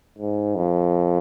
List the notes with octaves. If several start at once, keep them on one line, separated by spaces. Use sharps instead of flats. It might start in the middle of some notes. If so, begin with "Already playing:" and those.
G#2
F2